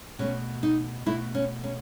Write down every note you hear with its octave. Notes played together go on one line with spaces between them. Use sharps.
B2 A3 C#4
D#4
B2 A3 E4
C#4
C#4